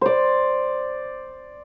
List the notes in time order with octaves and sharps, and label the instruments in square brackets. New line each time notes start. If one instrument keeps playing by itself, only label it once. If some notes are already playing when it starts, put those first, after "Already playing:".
[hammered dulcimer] C5 D5